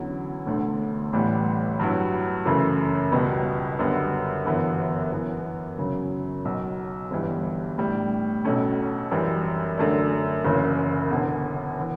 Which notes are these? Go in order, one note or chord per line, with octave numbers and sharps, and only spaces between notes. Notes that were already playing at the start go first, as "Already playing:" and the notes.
Already playing: E2 D3 F#3 C#4 E4
E1 D2 D3 A3
A1 A2 E3 G3 B3
G2 F#3 B3 E4
F#2 C#3 E3 A3
C#2 B2 G3 B3
F#2 D3 G3 B3
G1 F#2 E3 B3
F#2 E3 B3
F#2 C#3 F#3
B1 B2 F#3
G1 G2 E3 G3
A2 G3 D4
B1 B2 A3 C#4
F#2 E3 G3
F#2 D3 A3 D4
F#1 F#2 C#3 E3
E1 E2 D3
E3